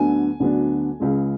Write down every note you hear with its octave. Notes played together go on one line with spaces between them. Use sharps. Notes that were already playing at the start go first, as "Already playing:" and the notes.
Already playing: D2 D3 F#3 B3 D4 G#5
D2 D3 F#3 B3 D4
C#2 C#3 G#3